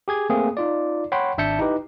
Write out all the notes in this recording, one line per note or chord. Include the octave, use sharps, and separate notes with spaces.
G4 G#4 G#6
A3 A#3 C4 G#4
D#4 F4 D5
C#5 F#5 G5 B5 C6
G#1 D4 E5 A5 G6 C#7
D#4 E4 G4 B4